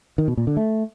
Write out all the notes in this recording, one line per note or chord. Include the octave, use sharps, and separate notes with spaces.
D#3
B2
A#2
D3
A3